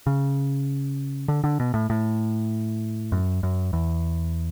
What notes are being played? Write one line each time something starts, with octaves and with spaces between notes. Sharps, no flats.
C#3
D3
D3
B2
A2
A2
F#2
F#2
E2